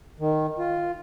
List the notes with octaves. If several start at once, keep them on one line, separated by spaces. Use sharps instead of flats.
D#3
F4